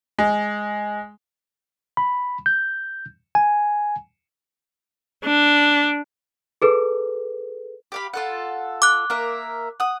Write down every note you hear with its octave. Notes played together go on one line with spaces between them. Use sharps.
G#3
B5
G6
G#5
D4
G#4 A4 B4
G4 F5 B5
F4 A4 F#5
D6 F#6
A#3 A#4 E5
F#5 D#6